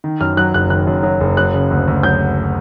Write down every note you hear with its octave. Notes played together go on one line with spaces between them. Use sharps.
D#3
F#2 F6
F#3 F#6
F#1 F#6
D#3 F#6
F#2
F#3
F#1
F#3 F#6
C#3
D2
D2
F#3 G6